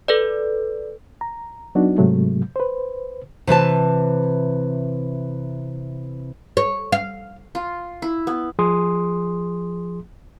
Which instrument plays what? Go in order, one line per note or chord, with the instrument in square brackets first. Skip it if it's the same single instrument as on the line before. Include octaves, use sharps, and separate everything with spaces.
[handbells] A4 B4 D5
[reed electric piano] A#5
F#3 B3 D4 D#4 F#4
G#2 C3 F#3 G#3 A3
B4 C5
[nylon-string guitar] C3 E3 B4 A5
[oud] C#5
F5
[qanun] F4
E4
B3
[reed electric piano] F3 G#4 C6 D#6